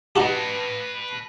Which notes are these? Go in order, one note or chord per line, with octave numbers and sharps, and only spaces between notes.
D#4 F#4 G4 B4 A5